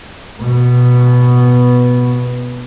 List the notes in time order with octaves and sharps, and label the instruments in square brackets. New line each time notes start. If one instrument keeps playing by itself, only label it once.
[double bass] B2 B3